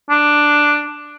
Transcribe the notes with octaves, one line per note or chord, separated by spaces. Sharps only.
D4